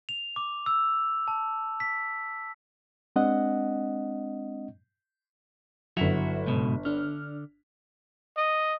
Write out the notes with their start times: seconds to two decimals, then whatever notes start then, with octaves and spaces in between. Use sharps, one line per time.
0.09 F7
0.36 D6
0.66 E6
1.28 A5
1.80 B6
3.16 G#3 C4 D4 D#5 F#5
5.97 G1 F#3 E4 F#4 E5 B6 F7
6.46 C#2 G#2 B2
6.85 D3 D4 F6
8.37 D#5